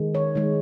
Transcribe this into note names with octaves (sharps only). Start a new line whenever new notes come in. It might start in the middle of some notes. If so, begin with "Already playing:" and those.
Already playing: D#3 G#3
C#5
D#3 G#3